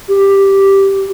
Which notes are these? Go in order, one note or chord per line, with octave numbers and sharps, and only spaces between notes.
G4